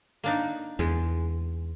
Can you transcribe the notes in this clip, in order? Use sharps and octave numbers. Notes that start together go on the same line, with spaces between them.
A#3 D4 D#4
E2 G#3